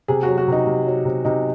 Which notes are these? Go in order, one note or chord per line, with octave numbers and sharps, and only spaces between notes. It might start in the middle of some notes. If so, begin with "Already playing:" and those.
C3 G#4
F#3 F#4
F#4
C3 D#4
C3
F#3
C3
C3 D#4